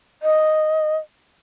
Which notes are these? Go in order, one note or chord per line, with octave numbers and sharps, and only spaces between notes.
D#5